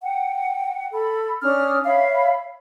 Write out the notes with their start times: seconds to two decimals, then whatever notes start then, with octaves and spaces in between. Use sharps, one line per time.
0.03 F#5 G5
0.92 A4 B5
1.42 C#4 D4 D#6 F6
1.84 C#5 E5 F5 B5